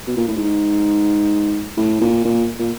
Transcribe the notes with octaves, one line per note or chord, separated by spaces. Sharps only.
B2
A#2
A2
G#2
A2
A#2
A#2
A#2